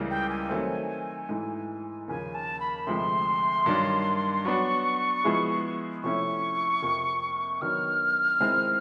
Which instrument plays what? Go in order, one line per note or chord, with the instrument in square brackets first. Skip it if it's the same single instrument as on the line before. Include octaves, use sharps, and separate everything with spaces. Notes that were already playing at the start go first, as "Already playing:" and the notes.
Already playing: [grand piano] C#2 C#3 E3 G3 A#3
[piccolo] G5
G#5
[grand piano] D#3 F#3 A3 C4
G#2 E3 A3
[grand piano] D#2 C#3 F3 [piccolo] G#5
[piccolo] A5
B5
[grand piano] D2 C3 F3 G#3 [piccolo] C6
[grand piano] G2 D#3 F#3 A#3 D4
[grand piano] F#3 B3 D4 F#4 [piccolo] C#6
[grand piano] F3 G#3 B3 E4 G#4
[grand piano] C3 F3 A3 C#4 E4 [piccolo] C#6
[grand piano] F2 C3 F3 A#3
[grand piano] D#3 F#3 B3 D4 [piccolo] F6
[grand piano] D#3 G#3 C4 E4